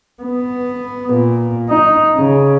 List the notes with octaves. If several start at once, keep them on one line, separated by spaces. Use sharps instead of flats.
B3
A#2
D#4
C#3